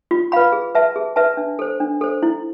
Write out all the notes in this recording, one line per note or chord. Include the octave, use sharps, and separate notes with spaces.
F4
B4 F5 B5
G#4
B4 E5 A5
G#4
B4 E5 A5
D4
A4 C5
D4
A4 C5
E4